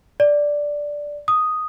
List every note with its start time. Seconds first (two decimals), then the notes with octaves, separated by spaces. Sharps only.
0.20 D5
1.28 D#6